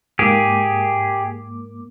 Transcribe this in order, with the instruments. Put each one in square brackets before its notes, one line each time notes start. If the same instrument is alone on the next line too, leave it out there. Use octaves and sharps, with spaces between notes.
[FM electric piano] G#2 A#3 D6 [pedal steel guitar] G4 G#4